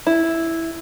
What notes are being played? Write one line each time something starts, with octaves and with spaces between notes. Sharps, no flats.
E4